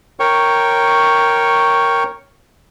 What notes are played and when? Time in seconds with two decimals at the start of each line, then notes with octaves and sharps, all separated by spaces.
0.20 A#4 C#5 G5 C#6